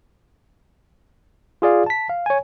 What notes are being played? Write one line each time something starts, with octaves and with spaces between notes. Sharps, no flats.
F4 G#4 D5 F5
A5 B6
F5
C#5 G#5